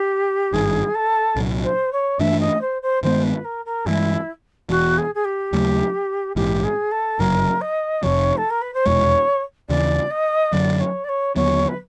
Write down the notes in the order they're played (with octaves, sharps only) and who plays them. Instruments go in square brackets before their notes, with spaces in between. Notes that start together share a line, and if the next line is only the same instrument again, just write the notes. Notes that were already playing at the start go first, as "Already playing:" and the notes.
Already playing: [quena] G4
[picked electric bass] G#1 G2 D#3 [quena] G#4
[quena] A4
[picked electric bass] C2 A#2 F#3
[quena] C5
C#5
[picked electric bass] G2 E3 A3 D4 [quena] E5
[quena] D#5
C5
C5
[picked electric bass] G2 D#3 G#3 B3 [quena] C5
[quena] B4
A#4
A#4
[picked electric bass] G2 E3 G#3 [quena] E4
[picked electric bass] E1 E2 B2 [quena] F#4
[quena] G#4
G#4
G4
[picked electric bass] D#2 C#3 F#3 A3
[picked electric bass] A#1 G#2 E3 [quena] G4
[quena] G#4
A4
[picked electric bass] G1 F#2 C#3 F#3 [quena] A#4
[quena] D#5
[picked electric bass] F1 F2 C3 F3 [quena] C#5
[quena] A4
A#4
B4
C5
[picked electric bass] F1 E2 B2 G#3 [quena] C#5
[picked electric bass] D#2 C#3 E3 [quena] D5
[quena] D#5
[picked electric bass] F#2 D3 F#3 [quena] D5
[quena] C#5
D5
C#5
[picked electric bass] D#2 D3 F#3 B3 [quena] C#5
[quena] B4